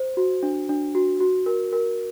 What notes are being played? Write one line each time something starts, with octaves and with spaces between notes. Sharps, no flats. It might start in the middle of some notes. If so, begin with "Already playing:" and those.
Already playing: C5
F#4
D4
D4
F#4
F#4
A#4
A#4